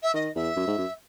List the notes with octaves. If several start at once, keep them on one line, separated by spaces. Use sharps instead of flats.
E5
D#3 D#5
E2 E5
F#2
G#2
F#2